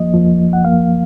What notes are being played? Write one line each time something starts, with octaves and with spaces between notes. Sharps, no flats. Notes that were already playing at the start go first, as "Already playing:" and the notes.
Already playing: F2 F3 A#3 D#5
F2 F3 A#3
F#5
F#2 F3 A#3 F5